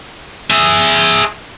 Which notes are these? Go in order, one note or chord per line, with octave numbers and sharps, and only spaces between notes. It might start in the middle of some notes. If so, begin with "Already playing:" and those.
G#4 E5